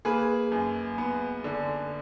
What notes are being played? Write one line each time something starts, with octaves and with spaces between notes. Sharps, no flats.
A#3 G#4 B4
F#2
B3
D3